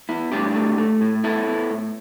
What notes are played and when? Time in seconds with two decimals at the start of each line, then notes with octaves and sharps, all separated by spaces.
0.09 B3 E4
0.32 A2 D4 G4
0.55 A3
0.78 A3
1.01 A2
1.24 B3 E4 A4
1.47 B3
1.70 A2